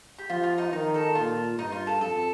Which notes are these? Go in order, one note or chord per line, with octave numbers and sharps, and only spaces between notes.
G4
F3 F4
F4
D#4
D#3 D#4
A4
A#2 F4
G2 D#4
F4
A4
F2 A4